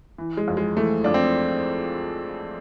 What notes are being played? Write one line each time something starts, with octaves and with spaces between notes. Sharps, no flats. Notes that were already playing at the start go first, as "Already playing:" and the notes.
E3
G#3
F2
G#3
E3 A3
F2 D4
C4